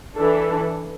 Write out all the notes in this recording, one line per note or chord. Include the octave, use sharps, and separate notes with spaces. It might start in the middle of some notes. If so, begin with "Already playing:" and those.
E3 D4 A4